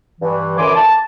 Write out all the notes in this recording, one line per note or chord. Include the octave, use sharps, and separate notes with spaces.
G2 E3
F#2 D3 E3 G#5 C6 D6
A5